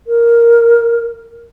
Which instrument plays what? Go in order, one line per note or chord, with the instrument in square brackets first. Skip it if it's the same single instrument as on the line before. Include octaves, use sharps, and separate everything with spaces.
[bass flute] A#4